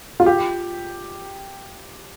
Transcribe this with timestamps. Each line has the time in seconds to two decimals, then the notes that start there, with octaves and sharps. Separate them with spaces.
0.20 F4
0.26 G4